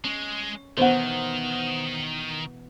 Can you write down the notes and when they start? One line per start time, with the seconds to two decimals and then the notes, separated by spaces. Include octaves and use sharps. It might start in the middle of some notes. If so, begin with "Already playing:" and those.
0.04 G#3 C#4
0.77 B2 D#3 E3 B3 C5 F#5